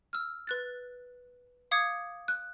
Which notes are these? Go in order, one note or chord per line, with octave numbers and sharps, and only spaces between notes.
E6 F6
B4 F#6 A6
F5 D6 D#6 G#6 C#7
F#6